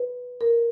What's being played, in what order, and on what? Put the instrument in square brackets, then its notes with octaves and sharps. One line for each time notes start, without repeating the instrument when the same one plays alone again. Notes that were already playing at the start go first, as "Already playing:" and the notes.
Already playing: [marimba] B4
A#4